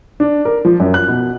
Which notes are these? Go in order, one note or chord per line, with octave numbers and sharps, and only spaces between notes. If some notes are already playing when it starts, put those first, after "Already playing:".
D4
A#4
F3
F#2
F#6
B2